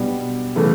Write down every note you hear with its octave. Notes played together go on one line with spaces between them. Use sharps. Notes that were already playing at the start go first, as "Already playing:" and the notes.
Already playing: B2 G3 B3 D4
C#3 E3 A3